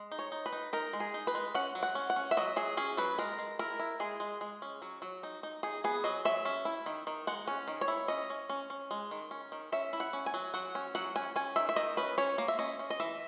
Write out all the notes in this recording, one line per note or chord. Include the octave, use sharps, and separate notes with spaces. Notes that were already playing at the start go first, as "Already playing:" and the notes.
Already playing: G#3
D#4
C#5
D#4
B4
D#4
D#4 A#4
G#3
G#4
D#4
B4
G#3
C#4 F#5
F#3
F#5
C#4
F#5
C#4
E5
F#3 D#5
F#3 G#4
C#4 G#4
F#3 B4
G#3 A#4
G#3
E4 A#4
E4
G#3 G#4
G#3
G#3
C#4
F#3
F#3
D#4
D#4
D#4 G#4
B3 G#4
F#3 D#5
F#3 E5
C#4
E4
D#3
D#3
G#3 F#5
C#4
D#3
C#5
E4
C#4 D#5
C#4
C#4
C#4
G#3
D#3
C#4
D#3
C#4 E5
E4
F#5
C#4
G#5
F#3
F#3 F#5
C#4
F#3 F#5
C#4 G#5
C#4 G#5
D#3 E5
E5
D#3 D#5
C#4 B4
C#4 C#5
A#3
E5
C#4 D#5
C#4
D#5
E3 E5